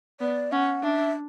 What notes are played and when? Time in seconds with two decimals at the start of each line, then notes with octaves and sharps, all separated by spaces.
0.21 B3 D5
0.52 C#4 F#5
0.83 D4 E5